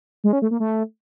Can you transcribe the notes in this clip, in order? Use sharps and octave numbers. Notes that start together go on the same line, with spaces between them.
G#3
C#4
A3
A#3
A3